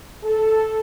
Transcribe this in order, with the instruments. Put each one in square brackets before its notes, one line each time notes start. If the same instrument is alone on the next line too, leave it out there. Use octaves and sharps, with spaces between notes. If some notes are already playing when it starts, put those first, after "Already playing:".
[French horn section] A4